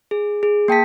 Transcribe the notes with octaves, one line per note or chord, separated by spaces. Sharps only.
G#4
G#4
A#3 G5 A5 B6